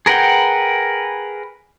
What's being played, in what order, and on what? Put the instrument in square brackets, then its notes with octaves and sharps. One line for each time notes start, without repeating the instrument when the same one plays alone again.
[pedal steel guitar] G#4 A#4 B4 F#5 G5